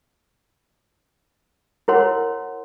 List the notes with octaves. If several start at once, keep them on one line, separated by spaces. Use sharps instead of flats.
E4 A#4 B4 C#5 F#5 C6